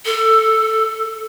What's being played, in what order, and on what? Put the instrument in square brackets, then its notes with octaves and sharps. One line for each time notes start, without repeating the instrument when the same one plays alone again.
[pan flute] A4